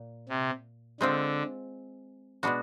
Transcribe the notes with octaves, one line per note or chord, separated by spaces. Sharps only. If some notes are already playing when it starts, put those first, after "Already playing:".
Already playing: A#2
C3
D3 G#3 C4 F4
B2 G#3 B3 D4 F#4